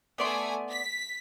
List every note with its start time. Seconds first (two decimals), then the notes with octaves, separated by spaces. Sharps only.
0.18 A3 B3 D5 G#5 C6
0.70 B6